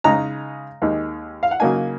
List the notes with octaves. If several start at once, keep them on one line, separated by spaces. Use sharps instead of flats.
C#3 G#3 D#4 A#5
D#2 D#3 G#3 D#4
F5
F#5
C#3 F#3 A#3 D#4 G#5